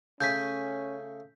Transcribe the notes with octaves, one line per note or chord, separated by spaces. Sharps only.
C#3 A3 C#4 G#5 G6 B6